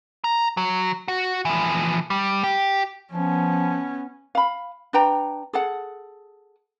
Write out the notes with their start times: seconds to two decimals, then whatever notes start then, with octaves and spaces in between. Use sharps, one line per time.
0.24 A#5
0.57 F#3
1.08 F#4
1.45 E3 F3
2.10 G3
2.43 G4
3.12 F3 B3 C#4
4.35 F5 B5
4.93 D4 B4 G5 A#5
5.53 G#4 A4 F#5